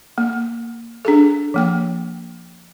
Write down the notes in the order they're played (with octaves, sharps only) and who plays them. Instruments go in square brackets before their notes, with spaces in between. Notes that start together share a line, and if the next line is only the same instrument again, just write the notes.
[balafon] A#3
D4 G#4 A4
F3 A#3 G5